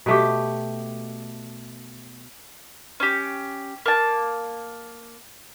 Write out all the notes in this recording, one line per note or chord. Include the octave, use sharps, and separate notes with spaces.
B2 A3 G4
C#4 G4
A#3 A5